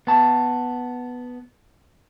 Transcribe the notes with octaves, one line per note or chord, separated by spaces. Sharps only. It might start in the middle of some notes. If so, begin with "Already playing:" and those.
B3 A5